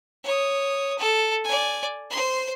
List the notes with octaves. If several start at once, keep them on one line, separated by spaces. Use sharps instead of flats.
C#5 D#6
A4
D5 G#5
C5 C6